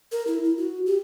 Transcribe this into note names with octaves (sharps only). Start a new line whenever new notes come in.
A#4
E4
E4
F#4
G4